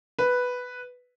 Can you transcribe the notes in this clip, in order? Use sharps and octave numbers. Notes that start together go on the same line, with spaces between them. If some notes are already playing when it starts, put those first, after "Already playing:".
B4